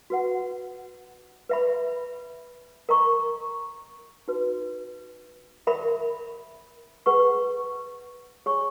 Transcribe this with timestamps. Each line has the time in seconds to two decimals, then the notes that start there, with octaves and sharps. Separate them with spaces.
0.10 F#4 B4 F#5
1.49 B4 E5 B5
2.89 A#4 D#5 A#5 C#6
4.28 D#4 F#4 B4
5.67 A#4 E5 B5
7.06 G#4 B4 F#5 C#6
8.46 G#4 C#5 G#5 C#6